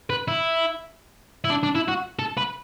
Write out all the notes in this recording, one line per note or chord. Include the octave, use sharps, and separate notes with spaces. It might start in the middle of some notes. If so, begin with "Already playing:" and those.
B4
E4
E4
D4
D4
E4
F#4
A4
B4